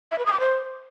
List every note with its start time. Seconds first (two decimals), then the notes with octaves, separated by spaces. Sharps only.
0.11 E5
0.19 B4
0.26 D#6
0.33 D6
0.40 C5